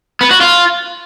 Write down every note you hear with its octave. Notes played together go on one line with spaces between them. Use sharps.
B3
F#4
F4